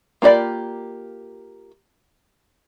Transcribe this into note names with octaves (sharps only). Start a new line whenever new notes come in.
A#3 F4 G4 D5 B5